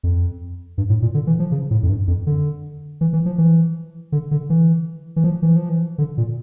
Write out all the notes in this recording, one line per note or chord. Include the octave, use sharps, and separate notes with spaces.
F2
G2
A2
A#2
D3
E3
F3
C#3
A2
F2
G2
F2
D3
E3
E3
F3
E3
D3
D3
E3
E3
F3
E3
F3
E3
D3
A#2